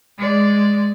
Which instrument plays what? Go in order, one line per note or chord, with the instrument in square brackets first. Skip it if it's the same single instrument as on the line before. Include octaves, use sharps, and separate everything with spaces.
[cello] G#3 D5